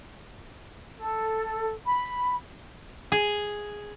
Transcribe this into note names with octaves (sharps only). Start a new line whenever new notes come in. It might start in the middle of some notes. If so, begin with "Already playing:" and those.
A4
B5
G#4